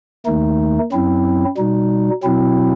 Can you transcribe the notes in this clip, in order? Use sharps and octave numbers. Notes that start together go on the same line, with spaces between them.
D#2 D#3 A3 D#4
F#2 F#3 C4 E4
B2 G3 D#4
B2 F#3 C4 E4